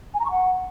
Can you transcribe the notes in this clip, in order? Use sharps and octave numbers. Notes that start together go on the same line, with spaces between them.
G#5
A#5
C#6
F#5